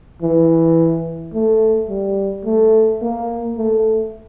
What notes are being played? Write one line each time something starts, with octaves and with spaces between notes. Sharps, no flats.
E3
A3
G3
A3
A#3
A3